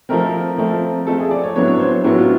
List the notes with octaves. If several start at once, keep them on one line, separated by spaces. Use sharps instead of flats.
F3 A3 C4 A#4
F3 A3 C4
F3 A3 C4 A4
G#4
D5
C#5
A2 F#3 B3 D4 C#5
C#5
C5
A2 F#3 B3 D4 F#4
F4